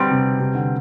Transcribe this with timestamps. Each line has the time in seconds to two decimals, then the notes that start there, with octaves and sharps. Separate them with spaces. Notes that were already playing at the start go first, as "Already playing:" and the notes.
Already playing: B2 D3 G3 C4
0.11 C3
0.40 C3
0.55 D3